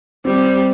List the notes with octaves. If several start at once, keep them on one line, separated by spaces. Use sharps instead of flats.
G3 C4